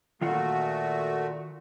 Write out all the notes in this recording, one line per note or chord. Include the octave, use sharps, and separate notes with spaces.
A#2 D#3 A3 F4 F#4 F#5